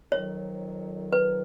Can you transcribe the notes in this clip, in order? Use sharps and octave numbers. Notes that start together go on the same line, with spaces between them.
F2 D#3 F#3 C#5
B4